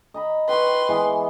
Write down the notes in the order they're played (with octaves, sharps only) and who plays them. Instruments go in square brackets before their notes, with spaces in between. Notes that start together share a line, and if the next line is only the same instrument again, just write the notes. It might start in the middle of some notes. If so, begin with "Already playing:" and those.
[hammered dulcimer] D#5 A#5 B5
[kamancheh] B4 C6 [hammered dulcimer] G5 C#6
[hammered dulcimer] E3 G#3 B3